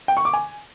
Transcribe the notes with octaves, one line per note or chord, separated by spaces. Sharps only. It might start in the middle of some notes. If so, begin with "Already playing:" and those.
G5
C#6
D6
G#5